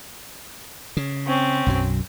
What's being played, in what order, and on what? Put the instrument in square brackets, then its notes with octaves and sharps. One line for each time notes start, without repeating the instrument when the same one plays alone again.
[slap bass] C#3
[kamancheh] C4 C#4
[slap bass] B1 F#2 F#3